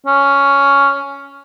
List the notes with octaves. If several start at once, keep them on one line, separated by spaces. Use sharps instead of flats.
C#4